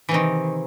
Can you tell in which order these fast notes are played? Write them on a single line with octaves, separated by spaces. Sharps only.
E3 C3 D#3